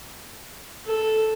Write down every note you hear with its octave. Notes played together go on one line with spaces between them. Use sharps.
A4